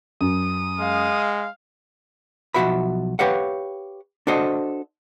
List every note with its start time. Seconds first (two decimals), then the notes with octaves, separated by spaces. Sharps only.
0.21 F#2 D#6
0.80 G#3 F5
2.54 B1 F3 F4 F#4 E5 B5
3.19 G4 B4 C#5 F5 F#5
4.27 D4 F#4 A4 C5 D#5